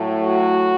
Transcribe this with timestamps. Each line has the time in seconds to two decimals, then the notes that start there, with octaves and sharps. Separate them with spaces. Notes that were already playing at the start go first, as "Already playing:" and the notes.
Already playing: A2 F#3 A3
0.25 F#4